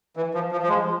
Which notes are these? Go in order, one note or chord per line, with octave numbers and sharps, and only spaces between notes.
E3
F3
F3
F3
G#3